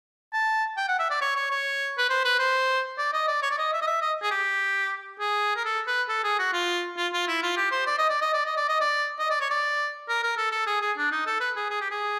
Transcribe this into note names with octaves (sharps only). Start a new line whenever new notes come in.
A5
G5
F#5
E5
D5
C#5
C#5
C#5
B4
C5
B4
C5
D5
D#5
D5
C#5
D5
D#5
E5
D#5
E5
D#5
G#4
G4
G#4
A#4
A4
B4
A4
G#4
F#4
F4
F4
F4
E4
F4
G4
C5
D5
D#5
D5
D#5
D5
D#5
D5
D#5
D5
D#5
D5
C#5
D5
A#4
A#4
A4
A4
G#4
G#4
D4
D#4
A4
B4
G#4
G#4
G4
G#4